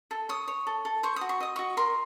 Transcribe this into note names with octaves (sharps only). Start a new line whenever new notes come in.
A4
C#5 D#6
C#5
A4
A4
C5 C#6
F#4 D#6
C#6
D#5 D#6
F#4 C#6
A#4 C6